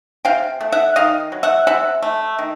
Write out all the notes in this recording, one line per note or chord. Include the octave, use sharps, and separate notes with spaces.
C3 F5 G5
A3
E5 F#5
D#3 D#5 F5
F#3
E5 F#5
C3 E5 F#5
A3
D#3